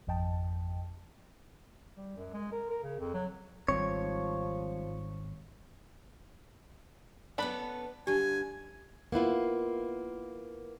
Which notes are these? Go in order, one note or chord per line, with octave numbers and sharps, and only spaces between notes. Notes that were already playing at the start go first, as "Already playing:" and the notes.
G#1 F2 D#5 G5 A5
G3
F#2
G#3
A#4
A#4
C#3
F2
F#3
G#1 G#2 F3 G3 C4 C#5
B3 C#4 D4 A4 B4 B5
G2 D3 G4 G#5
A#3 B3 E4 F4